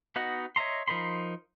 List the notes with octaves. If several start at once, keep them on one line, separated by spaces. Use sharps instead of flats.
B3 D#4 F#4 D#5 F#5
C#5 D#5 E5 A#5 C6
F3 D#4 A#4 B5 C6